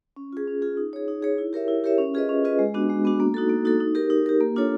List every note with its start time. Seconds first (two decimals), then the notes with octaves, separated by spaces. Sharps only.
0.16 C#4
0.33 F4 G#4
0.48 C#4
0.62 F4 G#4
0.77 D#4
0.93 G#4 C#5
1.08 D#4
1.22 G#4 C#5
1.38 E4
1.53 G4 A#4 C#5 E5
1.68 E4
1.84 G4 A#4 C#5 E5
1.98 C#4
2.14 F4 G#4 B4 D#5
2.29 C#4
2.45 F4 G#4 B4 D#5
2.59 G#3
2.74 B3 D4 F#4
2.89 G#3
3.05 B3 D4 F#4
3.20 A#3
3.34 D#4 F#4 A4
3.50 A#3
3.65 D#4 F#4 A4
3.80 D#4
3.95 G4 A#4
4.10 D#4
4.26 G4 A#4
4.40 A#3
4.56 D4 F4 A4 C#5